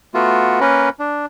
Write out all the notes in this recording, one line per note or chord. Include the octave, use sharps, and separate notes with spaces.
A3 B3 F4 F#4
A#3 C#4 A#4 B4
D4